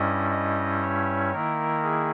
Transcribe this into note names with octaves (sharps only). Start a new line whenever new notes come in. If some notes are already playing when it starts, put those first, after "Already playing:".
Already playing: G2 G3 C#4 E4 D#5
D#5
C#5
D#3 A#3 E4 A#4
G#4